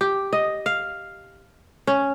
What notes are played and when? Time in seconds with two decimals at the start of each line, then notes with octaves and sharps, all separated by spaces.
0.01 G4
0.33 D#5
0.66 F5
1.87 C#4